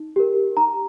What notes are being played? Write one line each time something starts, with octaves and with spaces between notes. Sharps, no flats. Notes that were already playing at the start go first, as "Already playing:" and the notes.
Already playing: D#4
G4 A#4
D#4 A#5